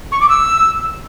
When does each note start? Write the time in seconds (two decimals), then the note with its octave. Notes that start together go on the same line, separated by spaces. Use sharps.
0.12 C#6
0.21 D6
0.29 E6